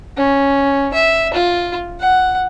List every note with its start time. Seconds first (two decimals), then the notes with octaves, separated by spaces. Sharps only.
0.17 C#4
0.94 E5
1.34 F4
2.00 F#5